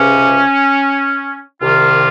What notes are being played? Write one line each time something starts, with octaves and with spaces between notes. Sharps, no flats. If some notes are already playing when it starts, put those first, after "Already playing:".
Already playing: C#2 C3 F3 C#4
C2 C3 D#3 F4